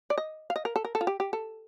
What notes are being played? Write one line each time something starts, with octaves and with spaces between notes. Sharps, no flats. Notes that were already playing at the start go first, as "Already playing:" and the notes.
D5
D#5
F5
D#5
A#4
A4
A#4
A4
F4
G4
G4
A4